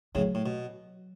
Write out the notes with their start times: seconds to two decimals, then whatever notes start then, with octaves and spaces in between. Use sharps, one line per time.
0.15 A2 C#3 F#3
0.35 A2
0.46 B2